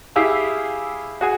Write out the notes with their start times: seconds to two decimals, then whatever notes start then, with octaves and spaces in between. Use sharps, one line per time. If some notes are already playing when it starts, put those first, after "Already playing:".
0.16 E4 G4 G#4 F5 E6
1.21 F#4 G#4 G#5